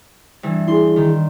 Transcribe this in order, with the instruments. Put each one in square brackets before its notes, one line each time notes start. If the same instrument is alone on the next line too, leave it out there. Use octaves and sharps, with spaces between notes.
[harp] G2 E3
[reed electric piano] E4 G#4 [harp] C6
[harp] D#3